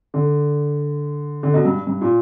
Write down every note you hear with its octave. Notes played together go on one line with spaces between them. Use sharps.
D3
D3
B2
G2
G2
A#2